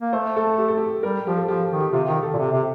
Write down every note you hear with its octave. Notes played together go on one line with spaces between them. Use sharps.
A#3
A3 C5
A4
G4
A4
G4
G3 A#4
F3 G4
A4
F3 G4
D#3
G4
C3 F4
D#3 G4
A4
A#2
C3
C3